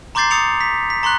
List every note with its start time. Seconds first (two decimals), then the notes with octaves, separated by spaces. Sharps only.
0.15 A#5 C6 D6 G6 A6 C7
0.31 D#6 A6 C#7 F7
0.61 B6
0.90 B6
1.03 A#5 C6 C#6 F#6